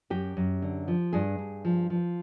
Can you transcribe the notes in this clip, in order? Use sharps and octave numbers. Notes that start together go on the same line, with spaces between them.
F#2 G4
F#2
D3
F3
G2 G#4
G2
F3
F3